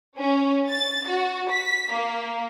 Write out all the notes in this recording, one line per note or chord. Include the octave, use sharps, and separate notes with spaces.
C#4
A6
F#4
B6
A#3